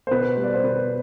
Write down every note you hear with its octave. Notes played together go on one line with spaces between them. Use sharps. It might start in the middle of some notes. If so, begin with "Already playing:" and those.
C5
B2 B4
G3
D5
C5
B2 B4